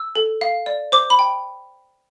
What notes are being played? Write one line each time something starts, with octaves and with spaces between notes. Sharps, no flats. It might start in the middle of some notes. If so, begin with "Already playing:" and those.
Already playing: E6
A4
F5
D5
C5 D6
B5
G5